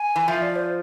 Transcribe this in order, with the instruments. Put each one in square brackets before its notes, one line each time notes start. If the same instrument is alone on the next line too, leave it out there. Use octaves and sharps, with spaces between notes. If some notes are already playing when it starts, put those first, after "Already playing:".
Already playing: [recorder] G#5
[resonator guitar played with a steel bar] E3
[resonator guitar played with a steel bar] F3 [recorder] E5
[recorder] D5
C5